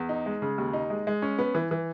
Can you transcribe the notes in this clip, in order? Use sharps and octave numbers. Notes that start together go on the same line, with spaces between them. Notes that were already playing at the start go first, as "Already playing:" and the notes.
Already playing: E2
D#4
G#3
C#3
D#2
D#4
G#3
G#3
C#4
B3
E3
E3